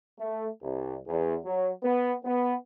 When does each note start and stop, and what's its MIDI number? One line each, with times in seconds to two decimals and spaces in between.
0.19 0.47 57
0.63 0.97 36
1.07 1.37 40
1.46 1.70 54
1.83 2.13 59
2.25 2.54 59